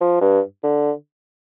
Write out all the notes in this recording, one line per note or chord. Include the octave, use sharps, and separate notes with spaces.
F3
G2
D3